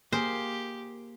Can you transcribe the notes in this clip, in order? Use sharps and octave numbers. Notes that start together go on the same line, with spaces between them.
A#3 G4 G#4 A#4 C5